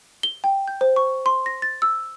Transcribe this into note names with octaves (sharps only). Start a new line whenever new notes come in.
G7
G5
G6
C5
C#6
C6
A#6
A6
E6